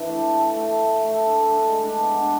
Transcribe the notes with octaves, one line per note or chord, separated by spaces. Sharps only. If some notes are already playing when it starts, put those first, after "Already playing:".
Already playing: E3 D4
A3
A4
A4
A3
E5
E5
A3
D4
A4
D4
G#3
D4
B3
D4